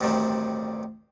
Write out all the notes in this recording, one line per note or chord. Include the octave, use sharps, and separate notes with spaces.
A1 D2 G2 C3 D#3